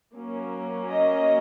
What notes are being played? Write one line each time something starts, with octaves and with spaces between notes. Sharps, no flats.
F#3 A#3 C#4
D#5